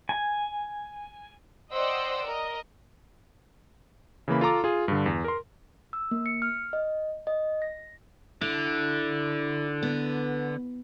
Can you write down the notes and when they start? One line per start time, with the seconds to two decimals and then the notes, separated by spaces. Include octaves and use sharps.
0.09 G#5
1.72 C5 D5 D#5 F#5 G5 E6
2.25 A#4 D#5
4.28 C#3 E3 A#3 B5
4.41 F4 A4 A#5 D6
4.64 F4 G#4
4.88 G2 D3
5.06 E2
5.24 A#4 C6
5.93 E6
6.11 A#3
6.26 C#7
6.42 F6
6.73 D#5
7.27 D#5
7.62 A#6
8.41 D3 E4
9.83 B3